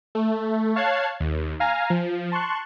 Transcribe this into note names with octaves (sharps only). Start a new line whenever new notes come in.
A3
C#5 F5 A5 F#6 G#6 C7
D#2
F5 G#5 A#5 F6
F3
A5 C6 C#6 F#6